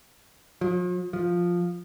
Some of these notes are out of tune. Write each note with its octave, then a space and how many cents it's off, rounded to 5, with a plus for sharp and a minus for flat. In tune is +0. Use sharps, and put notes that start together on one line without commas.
F3 +45
F3 +5